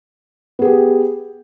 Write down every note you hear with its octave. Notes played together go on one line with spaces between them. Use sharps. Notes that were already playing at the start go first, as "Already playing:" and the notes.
B3 G4 G#4